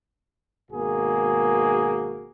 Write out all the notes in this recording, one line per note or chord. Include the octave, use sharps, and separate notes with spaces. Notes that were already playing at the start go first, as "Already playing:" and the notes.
G#1 B2 A#3 F#4 G#4